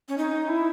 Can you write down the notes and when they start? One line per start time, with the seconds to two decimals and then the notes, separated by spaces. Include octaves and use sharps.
0.09 C#4
0.18 D#4
0.48 E4